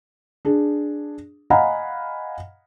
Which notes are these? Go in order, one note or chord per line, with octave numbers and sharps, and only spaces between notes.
D4 G#4
D#5 F5 F#5 G#5 A#5 B5